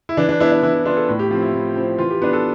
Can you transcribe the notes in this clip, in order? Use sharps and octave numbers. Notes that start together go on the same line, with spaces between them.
E4
E3 D4
D4
B3 D4 E4
D4
E3 E4
E4
B3 D4 F4
A4
A2
G4
F3 C4
E4
A2
F3 C4
E3 F4
G4
B3 D4 B4
A4